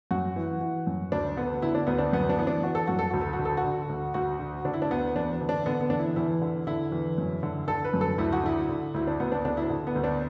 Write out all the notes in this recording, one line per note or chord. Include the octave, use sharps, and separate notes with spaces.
F#2 F#4
E3
E3
F#2
D2 D4
D3 B3
D3 E4
D4
D2 B3
D4
F#2 B3
D4
E3 B3
D4
E3 F#4
A4
F#2 F#4
A4
D2 F#4
A4
F#4
D3
A4
F#4
D3
D2
D2 F#4
D3
D3 D4
E4
D4
D2 B3
E2 D4
D3
D4
D3 B3
B3
E2 D4
E4
E2 E4
D3
D3 E4
E2
F#2
D3
D3 A4
B4
F#2
A4
D2 E4
F#4
D3 E4
D3
D2 E4
D4
D2 B3
D4
D3 D4
E4
D3
B3
D2
D4